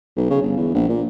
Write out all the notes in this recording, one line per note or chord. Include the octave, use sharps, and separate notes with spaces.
B1
C#3
G1
E2
A#1
A#2